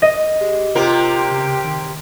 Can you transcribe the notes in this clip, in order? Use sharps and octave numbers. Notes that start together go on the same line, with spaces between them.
D#5
G#3 G4
C3 A#3 F4 G4 A#4
C#3
D#3